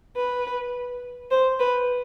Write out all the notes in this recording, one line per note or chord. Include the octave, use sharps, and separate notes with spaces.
B4
C5
B4